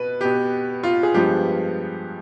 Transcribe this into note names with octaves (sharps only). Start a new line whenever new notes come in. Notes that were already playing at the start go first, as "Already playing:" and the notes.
Already playing: B2 B3 B4
B2 B3 G4
F4
G#4
G2 F3 G#3 B3 G4